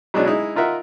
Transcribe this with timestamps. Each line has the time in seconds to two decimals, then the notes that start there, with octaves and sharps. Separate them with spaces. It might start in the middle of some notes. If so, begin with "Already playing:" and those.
0.14 B2 F#3 G#3 C#4 D4
0.26 G#3 D#4 E4
0.56 D#4 F4 A#4 E5 F#5